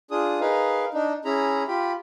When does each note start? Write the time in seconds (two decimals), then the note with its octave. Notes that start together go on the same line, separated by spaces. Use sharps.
0.11 D4 F4 G#4 D#6
0.40 D#4 G#4 A#4 B4 F5
0.94 D4 D#4
1.25 C#4 E4 G#4 A#5 B5
1.67 F4 G4 B5